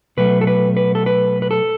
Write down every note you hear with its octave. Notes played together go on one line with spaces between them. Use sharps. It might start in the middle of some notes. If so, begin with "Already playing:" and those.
B2 F#3 A3 B4
A4
B4
B4
A4
B4
B4
A4